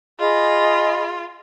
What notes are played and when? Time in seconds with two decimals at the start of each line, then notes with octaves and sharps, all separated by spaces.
0.19 F4 G#4 D#5 B5